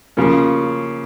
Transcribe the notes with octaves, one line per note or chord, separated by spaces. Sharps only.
C#3 F3 A#3 C#4